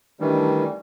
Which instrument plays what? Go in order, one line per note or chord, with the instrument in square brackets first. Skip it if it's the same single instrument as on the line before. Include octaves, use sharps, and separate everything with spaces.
[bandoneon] D#3 E3 G3 [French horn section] A3 D4